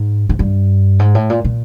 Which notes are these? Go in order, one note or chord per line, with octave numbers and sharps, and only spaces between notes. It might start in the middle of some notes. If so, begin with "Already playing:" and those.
Already playing: G#2
G#2
G2
G#2
A2
A#2
A#2